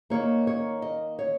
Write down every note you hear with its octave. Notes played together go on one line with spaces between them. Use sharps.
D#3 A#3 C#5
C#5
D#5
C#5